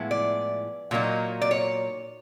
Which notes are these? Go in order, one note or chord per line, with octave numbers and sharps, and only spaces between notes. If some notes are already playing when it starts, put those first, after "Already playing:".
Already playing: A2 F3 G#3 B3 E4
D5
A#2 F#3 A#3 D#4
D5
C#5